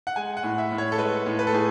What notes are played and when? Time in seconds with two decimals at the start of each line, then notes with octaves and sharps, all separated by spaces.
0.07 F#5
0.16 G#3 G#5
0.37 F#5
0.43 A2
0.58 E5
0.72 A2
0.78 C#5
0.92 A4
0.98 G#3 B4
1.26 A2
1.39 B4
1.47 A4
1.53 A2 G#4